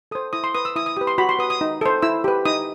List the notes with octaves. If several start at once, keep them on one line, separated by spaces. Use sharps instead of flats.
A4 C5 D#6
E4 D#6
C6
B4 D#6
E6
E4 D#6
D#6
G4 B4 D#6
C6
F#4 B5
C6
B4 D#6
D#6
D#4
A4 C5
E4 E6
G4 B4
D#4 D#6